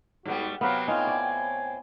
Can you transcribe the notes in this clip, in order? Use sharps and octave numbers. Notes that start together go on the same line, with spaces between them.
G#2 G3 B3 F#4
C3 F#3 B3 C4 B4 F5
A2 C4 D#4 F4 F5 G#5
D5